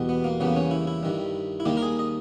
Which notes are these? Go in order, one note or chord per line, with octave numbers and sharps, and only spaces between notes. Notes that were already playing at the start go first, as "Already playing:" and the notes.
Already playing: E2 B2 G3
B3
A#3
E2 C#3 G3 A#3 B3
C#4
E4
E4
G2 D#3 G3
E4
D#2 D#3 G3 A#3 G4
A#4
G#4
D#5